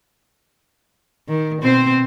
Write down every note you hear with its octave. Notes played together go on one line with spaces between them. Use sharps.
D#3
B2 C4 C5